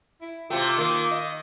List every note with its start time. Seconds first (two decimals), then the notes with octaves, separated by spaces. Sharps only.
0.21 E4
0.50 C3 A3 F4 G5 D6
0.77 D#3 A#3
1.11 D#5